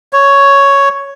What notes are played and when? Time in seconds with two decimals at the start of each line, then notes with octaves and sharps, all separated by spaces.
0.13 C#5